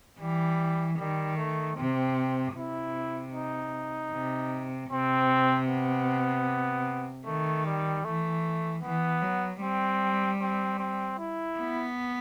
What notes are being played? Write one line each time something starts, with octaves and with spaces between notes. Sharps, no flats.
E3 G3
D#3 G3
A3
C3 C4
C3 E4
D#4
C3
C3 C4
B3
D#3 A3
G3
E3 A3
E3 B3
F#3
G3 C4
C4
C4
E4
B3